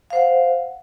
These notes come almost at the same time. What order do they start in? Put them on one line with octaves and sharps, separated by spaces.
F5 C5 F#5